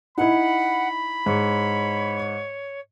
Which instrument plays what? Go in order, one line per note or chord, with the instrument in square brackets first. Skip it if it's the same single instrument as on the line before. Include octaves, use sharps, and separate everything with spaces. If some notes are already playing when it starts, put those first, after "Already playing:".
[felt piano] D#4 E4 [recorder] F#5 [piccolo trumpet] B5
[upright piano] G#2 [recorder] C#5